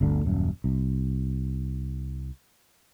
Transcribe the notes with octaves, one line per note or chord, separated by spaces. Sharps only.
G1 D2 D3
D#1 F#2
C2